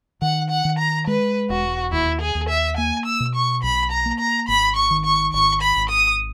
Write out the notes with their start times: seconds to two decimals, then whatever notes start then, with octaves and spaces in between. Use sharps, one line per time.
0.22 D#3 F#5
0.50 F#5
0.65 D#3
0.79 A#5
1.07 G#3 B4
1.50 E1 F#4
1.92 D#2 E4
2.21 G#4
2.35 D#2
2.49 E5
2.77 A#3 G#5
3.06 E6
3.20 B2
3.35 C#6
3.63 B1 B5
3.92 A#5
4.06 A#3
4.20 A#5
4.48 G#1 B5
4.76 C#6
4.91 D#3
5.05 C#6
5.33 G#1 C#6
5.62 B5
5.76 G#1
5.90 D#6